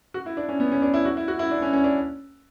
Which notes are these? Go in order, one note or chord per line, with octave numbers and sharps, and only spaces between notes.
F#4
E4
D4
C#4
B3
C#4
D4
E4
F#4
E4
F#4
E4
D4
C#4
C#4
D4